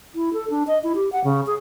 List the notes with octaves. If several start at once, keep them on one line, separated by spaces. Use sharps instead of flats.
E4
A4
D4
D#5
E4
G4
F#5
C#3
G#4